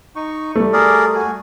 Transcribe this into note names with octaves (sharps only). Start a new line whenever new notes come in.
D#4 C#6
G3 A3
G#4 A#4 D5
F#4 G#5